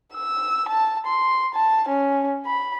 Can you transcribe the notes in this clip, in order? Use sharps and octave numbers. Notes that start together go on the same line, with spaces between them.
E6
A5
C6
A5
C#4
B5